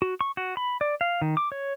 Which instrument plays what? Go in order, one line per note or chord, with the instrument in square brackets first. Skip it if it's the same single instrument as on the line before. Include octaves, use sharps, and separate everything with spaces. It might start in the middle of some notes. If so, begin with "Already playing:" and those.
[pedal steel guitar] F#4
C#6
F#4
B5
D5
F5
D#3
D6
C#5